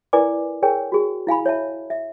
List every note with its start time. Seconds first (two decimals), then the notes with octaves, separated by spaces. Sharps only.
0.13 E4 A#4 B4 D5 G#5 D6
0.63 G#4 A#4 C#5 G5 G#5
0.92 F#4 G#4
1.27 E4 F5 G#5 B5
1.46 C#5 E5 A5
1.90 E5